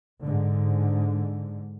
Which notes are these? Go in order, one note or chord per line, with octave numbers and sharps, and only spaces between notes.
G#2 D3